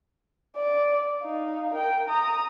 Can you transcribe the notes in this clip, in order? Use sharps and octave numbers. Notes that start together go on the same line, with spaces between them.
D5
D#4 F5
A#4 G5
A#5 D#6